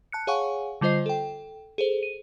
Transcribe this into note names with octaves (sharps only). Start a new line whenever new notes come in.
A5 F#6 C#7
G#4 C#5 F5 F#5 G#5 C#6
D3 G3 F4 C5 D#5 C7
A4 G5
G#4 A4 C5
D#7